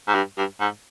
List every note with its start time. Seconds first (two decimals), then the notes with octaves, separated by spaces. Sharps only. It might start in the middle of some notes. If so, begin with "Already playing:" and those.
0.08 G#2
0.14 G2
0.37 G2
0.60 G#2